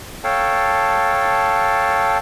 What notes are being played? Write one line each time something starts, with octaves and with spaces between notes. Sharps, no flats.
A4 C#5 F5 G5 A5